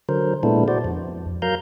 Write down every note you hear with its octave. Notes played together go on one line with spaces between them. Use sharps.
D3 F#3 A#4 C5
A#2 G#3 B3 D4 E4 A4
F#4 C5 D5
F2
F#3 A#4 F5 A#5 G6